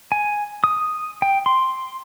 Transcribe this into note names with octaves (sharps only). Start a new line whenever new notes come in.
G#5
D#6
G5
C6